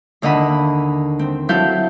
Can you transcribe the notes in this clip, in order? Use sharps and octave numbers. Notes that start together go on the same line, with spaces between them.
D#2 D3 D#5 F#5 B5 E6
C4
F#3 E4 A4 F5 G6